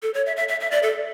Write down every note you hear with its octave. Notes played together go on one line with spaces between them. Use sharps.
A4
C#5
E5
E5
E5
E5
D5
A4